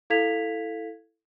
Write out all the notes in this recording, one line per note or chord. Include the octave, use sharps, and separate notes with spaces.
E4 A4 F5 G#6 B6 F7